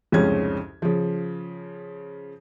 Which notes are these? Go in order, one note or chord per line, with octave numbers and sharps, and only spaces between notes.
C2 F2 G#2 C#3 C#4 G#6
C#3 F3